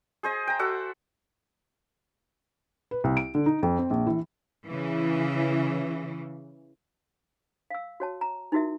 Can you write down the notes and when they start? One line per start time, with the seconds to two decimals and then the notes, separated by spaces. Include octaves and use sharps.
0.23 G#4 C5 D#5
0.47 G5 A#5
0.59 F#4 A4 E5 F#5
2.91 B4
3.04 C2
3.17 D7
3.35 D3
3.46 D#4
3.63 F2
3.79 C4
3.90 A#1
4.07 E3
4.67 C#3 E3
7.70 F5 E6
8.00 F#4 C#5 A5
8.21 A#5
8.52 D#4 E4 F#4 A#4 E5